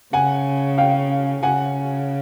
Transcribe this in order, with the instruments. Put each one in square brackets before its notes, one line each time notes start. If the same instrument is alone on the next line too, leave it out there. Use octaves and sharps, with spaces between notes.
[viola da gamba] C#3 [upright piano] F#5 G#5
[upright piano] F5 G5
[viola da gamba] C#3 [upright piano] F#5 G#5